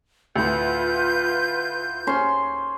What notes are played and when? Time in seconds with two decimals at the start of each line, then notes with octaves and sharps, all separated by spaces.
0.36 D2 A2 F4 B4 G6
2.07 C#4 C5 C6